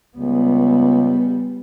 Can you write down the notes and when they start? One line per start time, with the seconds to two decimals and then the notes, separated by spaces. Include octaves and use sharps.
0.17 C#2 G3 B3